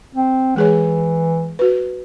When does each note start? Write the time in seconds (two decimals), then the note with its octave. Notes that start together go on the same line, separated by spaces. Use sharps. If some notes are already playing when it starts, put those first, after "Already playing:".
0.15 C4
0.56 E3 G#3 G#4 C#5
1.59 F#4 B4